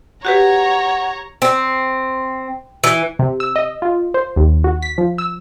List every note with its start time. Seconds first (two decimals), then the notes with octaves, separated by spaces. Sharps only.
0.25 F#4 G4 B4 C#5 F#5 A#5
1.42 C4
2.84 E3
3.19 C3
3.40 E6
3.56 D#5
3.82 F4
4.14 C5
4.36 D#2
4.64 F#4
4.82 B6
4.98 F3
5.18 E6